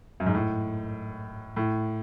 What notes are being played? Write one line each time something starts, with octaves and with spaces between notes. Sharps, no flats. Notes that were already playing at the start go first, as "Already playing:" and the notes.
F#2
G#2
A2
A2